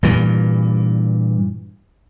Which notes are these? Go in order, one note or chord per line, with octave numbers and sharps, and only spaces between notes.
G2 A#2 E3